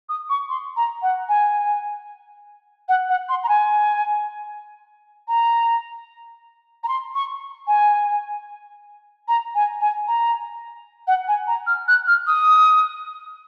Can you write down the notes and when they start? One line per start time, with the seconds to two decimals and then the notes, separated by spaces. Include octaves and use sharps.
0.09 D#6
0.30 C#6
0.49 C6
0.77 A#5
1.02 F#5
1.29 G#5
2.89 F#5
3.09 F#5
3.29 C6
3.44 A#5
3.49 G#5
5.28 A#5
6.84 A#5
6.88 C6
7.15 C#6
7.68 G#5
9.28 A#5
9.55 G#5
9.81 G#5
10.08 A#5
11.08 F#5
11.28 G#5
11.47 A#5
11.67 F6
11.88 F#6
12.07 F6
12.27 D#6